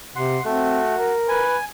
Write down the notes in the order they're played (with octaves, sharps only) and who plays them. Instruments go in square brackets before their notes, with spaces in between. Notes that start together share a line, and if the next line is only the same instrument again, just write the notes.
[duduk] C3 [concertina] F#5 C6
[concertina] A3 [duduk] C4 [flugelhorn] F#4
[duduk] A#4
[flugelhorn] B4 [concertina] G#5